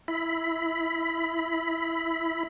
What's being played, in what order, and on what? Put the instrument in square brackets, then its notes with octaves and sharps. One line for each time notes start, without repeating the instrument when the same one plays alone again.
[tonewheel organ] E4 B5